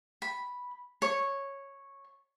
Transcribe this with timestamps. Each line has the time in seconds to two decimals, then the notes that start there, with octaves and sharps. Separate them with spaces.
0.22 B5
1.02 C#5